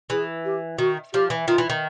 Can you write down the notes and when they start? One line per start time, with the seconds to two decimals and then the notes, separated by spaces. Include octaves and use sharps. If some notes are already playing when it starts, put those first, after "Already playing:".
0.10 E3 G#4
0.45 G4
0.78 D#3 F#4
1.13 F3 G4
1.30 E3
1.48 D#3 F4
1.58 E3
1.70 D#3